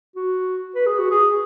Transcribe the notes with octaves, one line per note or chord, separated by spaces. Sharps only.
F#4
B4
G#4
F#4
G#4